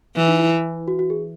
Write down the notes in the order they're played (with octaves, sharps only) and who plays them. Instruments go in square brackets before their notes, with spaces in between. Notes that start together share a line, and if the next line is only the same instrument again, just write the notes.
[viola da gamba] E3 [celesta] E4
[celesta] D#4
E4
F#4
F#4
G#4